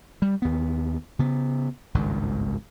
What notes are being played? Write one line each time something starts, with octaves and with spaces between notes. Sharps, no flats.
G3
D#2 B3
C#3 B3
G#1 C#2 G2 D#3